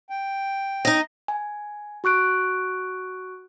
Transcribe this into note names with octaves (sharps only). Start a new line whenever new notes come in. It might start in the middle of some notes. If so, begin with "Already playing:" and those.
G5
D#4 D#5
G#5
F#4 C#6 F#6 D7